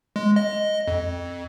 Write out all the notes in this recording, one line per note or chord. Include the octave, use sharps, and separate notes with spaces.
G#3
D#5
F2